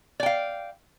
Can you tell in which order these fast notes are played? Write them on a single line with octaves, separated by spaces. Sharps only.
D5 G5 F5